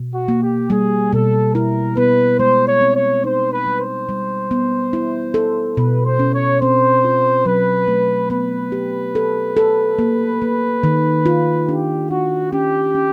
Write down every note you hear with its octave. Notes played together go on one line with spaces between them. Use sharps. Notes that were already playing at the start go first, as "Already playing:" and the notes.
Already playing: B2
F#4
A#3
G4
G3 G#4
B2 A4
E4 A#4
B3 B4
G#3 C5
C#5
C4
C#5
D#4 C5
B4
G3
C5
G3
B3
E4
A4
B2 B4
C5
C#4
C#5
C4 C5
F4
F#3 B4
A3
B3 B4
G4
A4
A4
A#3
A#3
D#3
F4
D4 G4
D4 F#4
C#4 G4
C#4